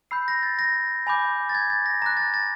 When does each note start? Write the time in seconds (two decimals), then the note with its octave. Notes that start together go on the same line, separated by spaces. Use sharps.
0.11 B5 E6 G6 C7
0.28 A#6
0.43 A6
0.59 A#6
1.07 G#5 B5 D6 G6
1.49 A6
1.55 G#6
1.70 A6
1.86 A#6
2.02 A#5 D6 F#6 A#6
2.17 A6
2.34 A6